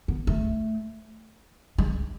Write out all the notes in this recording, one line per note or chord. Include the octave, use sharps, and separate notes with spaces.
B3
A3
G#3